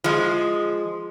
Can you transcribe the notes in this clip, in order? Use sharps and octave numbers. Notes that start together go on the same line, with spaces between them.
F3 G#3